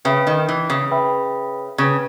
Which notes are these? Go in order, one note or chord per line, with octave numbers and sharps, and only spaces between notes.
C#3 B4 E5 G5 B5
D#3
E3
C#3
B4 E5 G5 B5
C#3 B4 G5 C#6